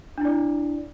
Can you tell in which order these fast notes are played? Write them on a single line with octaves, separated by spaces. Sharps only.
D4 E4 D5